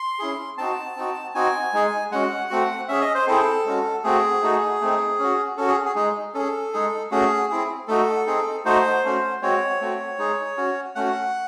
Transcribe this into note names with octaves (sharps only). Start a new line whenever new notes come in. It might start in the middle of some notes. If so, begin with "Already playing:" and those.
Already playing: C6
C#4 E4 G#4
C4 D#4 F#4 A5
C4 D#4 F#4
C4 D#4 F#4 G#5
G#3 D#4 G#4
G#3 C#4 F#4 F#5
A3 C4 F#4
C#4 G#4 E5
D#5
C5
C4 E4 G#4 A4
G#3 C#4 F#4
A3 C4 F#4 G#4
A3 D#4 F#4
A3 C4 D#4
C#4 F#4
C#4 F#4 A4
G#4
G#4
G#3 D#4 G#4
C#4 G#4 A4
G#3 D#4 G#4
A3 C#4 F#4 G#4
C4 E4 G#4
A3 D#4 F#4 A4
C4 D#4 G#4
A3 D#4 F#4 C5
A3 C#4 F#4
G#3 C4 F#4 C#5
A3 C4 F#4
G#3 D#4 G#4
C#4 F#4
A3 C#4 F#4 F#5